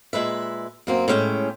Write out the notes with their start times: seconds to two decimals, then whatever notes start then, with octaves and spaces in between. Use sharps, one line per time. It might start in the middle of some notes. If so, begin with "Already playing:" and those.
0.13 A#2 G#3 B4 E5
0.87 F#2 A#3 C4
1.08 A2 G#3 C#4 G5